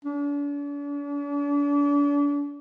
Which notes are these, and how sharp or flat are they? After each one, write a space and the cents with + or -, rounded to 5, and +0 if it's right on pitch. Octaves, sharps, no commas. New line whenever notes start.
D4 -40